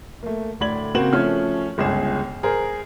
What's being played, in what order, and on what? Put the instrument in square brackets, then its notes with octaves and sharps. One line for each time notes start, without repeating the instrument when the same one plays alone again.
[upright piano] A3 A#3
D2 A2 D5 B5 G#6 F#7
C#3 A#3 C4 F#4 E7 F#7
F3 A3 C#4 F6
G1 C#2 G#4 E7
G#4 A#4 C5